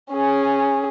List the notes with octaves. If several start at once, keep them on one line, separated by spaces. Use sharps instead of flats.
C#4 G#4